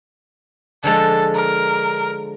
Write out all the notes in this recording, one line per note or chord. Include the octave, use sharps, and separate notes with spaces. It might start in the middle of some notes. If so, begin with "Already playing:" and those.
D3 F3 G#3 A4
A#4